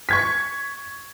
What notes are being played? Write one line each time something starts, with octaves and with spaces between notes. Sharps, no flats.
C#6 G#6 B6